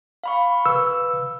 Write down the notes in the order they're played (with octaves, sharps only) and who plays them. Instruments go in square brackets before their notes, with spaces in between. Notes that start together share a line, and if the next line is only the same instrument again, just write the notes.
[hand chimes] F5 B5 C#6
[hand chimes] B4 [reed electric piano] E6